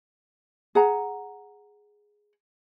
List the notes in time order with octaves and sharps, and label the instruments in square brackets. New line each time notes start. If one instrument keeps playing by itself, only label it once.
[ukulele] G#4 F#5 A#5